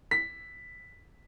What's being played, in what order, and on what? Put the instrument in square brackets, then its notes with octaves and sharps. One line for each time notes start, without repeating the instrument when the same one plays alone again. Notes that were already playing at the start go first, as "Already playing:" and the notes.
[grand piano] B6